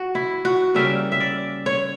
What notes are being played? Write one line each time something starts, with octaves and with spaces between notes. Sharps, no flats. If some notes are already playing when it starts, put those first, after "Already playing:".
Already playing: F#4
E4
F#4
C#3 G3 A#3 C#4 E5
E5
D5
C#5